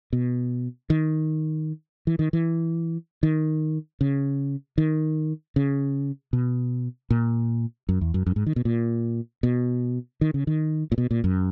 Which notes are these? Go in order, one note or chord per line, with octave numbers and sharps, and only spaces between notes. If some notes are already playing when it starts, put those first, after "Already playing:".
B2
D#3
E3
D#3
E3
D#3
C#3
D#3
C#3
B2
A#2
F#2
E2
F#2
F#2
G#2
D#3
B2
A#2
B2
D#3
C#3
D#3
A#2
B2
A#2
F#2